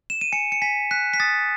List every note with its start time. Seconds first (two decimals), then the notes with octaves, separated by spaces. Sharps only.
0.10 E7
0.21 D#7
0.33 G#5 C#7
0.52 C#7
0.62 G#5 B6
0.91 F#6 B6
1.14 B6
1.20 D#6 A6